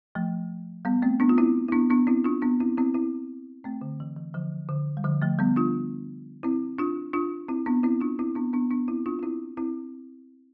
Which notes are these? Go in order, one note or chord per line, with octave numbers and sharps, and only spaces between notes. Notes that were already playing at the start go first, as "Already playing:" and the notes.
F3 A3
G3 B3
A3 C4
B3 D4
F4
C4 E4
E4
B3 D4
B3 D4
C4 E4
D4 F4
B3 D4
C4 E4
C4 E4
C4 E4
A3 C4
D3
E3
E3
D3 F3
D3
G3
D3 F3
F3 A3
G3 B3
D4 F4
C4 E4
D4 F4
D4 F4
C4 E4
B3 D4
C4 E4
D4 F4
C4 E4
B3 D4
B3 D4
B3 D4
C4 E4
D4 F4
F4
C4 E4
C4 E4